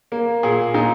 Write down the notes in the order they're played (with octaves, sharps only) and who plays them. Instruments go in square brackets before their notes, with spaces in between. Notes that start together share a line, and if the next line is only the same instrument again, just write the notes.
[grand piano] A#3
A#2 G#4
A#2 D#4